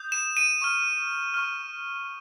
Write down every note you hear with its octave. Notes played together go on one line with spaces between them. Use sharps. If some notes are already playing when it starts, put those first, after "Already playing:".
Already playing: D#6 G6
E7
D#7
C#6 F6
C#6 F6